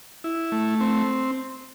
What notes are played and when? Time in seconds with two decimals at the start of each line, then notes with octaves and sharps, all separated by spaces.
0.24 E4
0.52 A3
0.81 C4